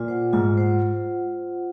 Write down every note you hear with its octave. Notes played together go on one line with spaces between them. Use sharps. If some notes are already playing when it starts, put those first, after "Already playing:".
Already playing: A#2 F4
C5 F#5
G#2 F4
C5 F#5